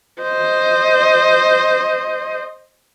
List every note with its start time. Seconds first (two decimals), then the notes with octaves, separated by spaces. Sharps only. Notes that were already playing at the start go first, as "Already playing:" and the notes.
0.22 C5 D#5